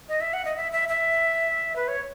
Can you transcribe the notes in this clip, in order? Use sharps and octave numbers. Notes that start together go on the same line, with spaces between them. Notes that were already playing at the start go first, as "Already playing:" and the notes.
D#5
E5
F#5
D#5
E5
E5
E5
B4
C#5